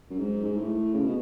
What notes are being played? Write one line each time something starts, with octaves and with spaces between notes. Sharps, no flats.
F#2
G#2
G#2
A2
C#3
B2